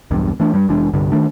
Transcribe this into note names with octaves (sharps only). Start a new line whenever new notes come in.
B1 E2 G2
E3 A3 D4
G2 G3
F1 E3 G#3 D4
C2 G2 D3
D#3 A3 D4